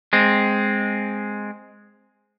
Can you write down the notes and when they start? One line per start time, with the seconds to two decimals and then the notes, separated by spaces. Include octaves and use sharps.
0.13 G#3 C4